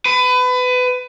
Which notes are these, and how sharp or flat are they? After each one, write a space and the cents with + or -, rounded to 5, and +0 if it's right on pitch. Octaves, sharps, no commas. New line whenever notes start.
B4 +25